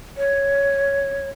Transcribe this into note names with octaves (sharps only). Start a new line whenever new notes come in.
C#5